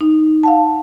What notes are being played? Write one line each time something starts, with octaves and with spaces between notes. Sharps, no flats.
D#4
F5 F#5 A5